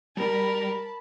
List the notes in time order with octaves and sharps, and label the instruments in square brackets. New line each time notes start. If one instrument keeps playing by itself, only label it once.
[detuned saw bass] G3 [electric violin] A#4 [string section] A5 B5